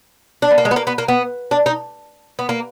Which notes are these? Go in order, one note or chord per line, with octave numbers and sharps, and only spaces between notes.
D4
B3
A#3
G#3
B3
A#3
B3
A#3
B3
D4
D#4
B3
A#3